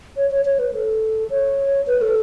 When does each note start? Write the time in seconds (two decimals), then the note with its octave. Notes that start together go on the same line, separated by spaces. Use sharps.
0.17 C#5
0.31 C#5
0.45 C#5
0.59 B4
0.73 A4
1.30 C#5
1.87 B4
2.02 A4